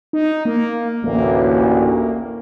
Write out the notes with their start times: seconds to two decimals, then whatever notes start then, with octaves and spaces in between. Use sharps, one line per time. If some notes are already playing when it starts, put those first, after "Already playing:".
0.13 D#4
0.45 A#3
1.04 A1 D2 A#3